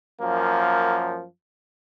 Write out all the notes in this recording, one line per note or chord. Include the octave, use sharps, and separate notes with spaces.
F#2 F3 A#3